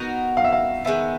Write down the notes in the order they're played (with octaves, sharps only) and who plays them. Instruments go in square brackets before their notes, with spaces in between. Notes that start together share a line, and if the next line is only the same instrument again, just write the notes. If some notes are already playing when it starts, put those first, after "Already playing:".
Already playing: [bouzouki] B3 D#4 F#4 A#4
[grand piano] F5
E5
F5
[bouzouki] D#3 G#3 B3 [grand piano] E5